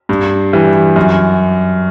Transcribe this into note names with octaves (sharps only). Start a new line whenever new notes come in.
G2
E3 G3
F#2